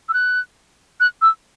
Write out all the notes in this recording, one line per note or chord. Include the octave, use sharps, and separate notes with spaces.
E6
F#6
F#6
E6